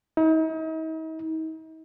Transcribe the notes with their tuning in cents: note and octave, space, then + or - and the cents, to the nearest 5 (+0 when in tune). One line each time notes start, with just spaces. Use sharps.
D#4 +40